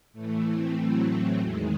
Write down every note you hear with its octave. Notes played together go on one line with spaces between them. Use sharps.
A2 E3 A3
C4
F#3
F#3
E2 D#3 G#3